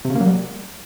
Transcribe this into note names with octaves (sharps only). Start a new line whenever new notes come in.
C3
C#3
A#3
F#3
G3